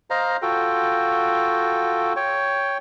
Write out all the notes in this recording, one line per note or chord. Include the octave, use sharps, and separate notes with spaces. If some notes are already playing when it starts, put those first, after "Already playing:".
C5 D#5 F5 A#5
F4 F#4 A4 G5
C#5 G5